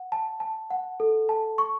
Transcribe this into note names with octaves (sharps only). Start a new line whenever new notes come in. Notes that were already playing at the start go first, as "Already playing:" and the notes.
Already playing: F#5
A5
A5
F#5
A4
A5
C#6